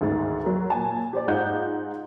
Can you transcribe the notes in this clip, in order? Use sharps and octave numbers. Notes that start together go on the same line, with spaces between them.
D2 G#2 D#3 A6
F#3 A#4
A#2 G#5 A5
G4 C5 D5
G#2 D#4 F4 D#5 F#5 G6